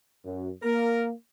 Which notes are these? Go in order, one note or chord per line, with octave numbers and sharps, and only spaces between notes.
F#2
A#3 A#4